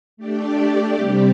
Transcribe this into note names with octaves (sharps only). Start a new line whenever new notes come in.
A3 D4 G4 D5
C3 G3 C4 G4